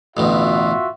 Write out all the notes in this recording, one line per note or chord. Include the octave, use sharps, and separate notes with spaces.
A1 D2 B2 F4 F#4 E5